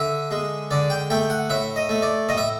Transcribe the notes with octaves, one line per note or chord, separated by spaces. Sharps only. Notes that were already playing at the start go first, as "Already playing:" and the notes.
Already playing: D3 E5
G#3
D3 D5
G5
A3 G5
F#5
A2 E5
D#5
A3
D5
A2 D#5
E5